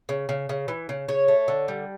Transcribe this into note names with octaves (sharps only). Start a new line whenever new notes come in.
C#3
C#3
C#3
E3
C#3
C#3 C#5
A3
D3
G3